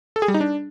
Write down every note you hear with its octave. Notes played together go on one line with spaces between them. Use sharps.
A4
G#4
G3
D#4
D4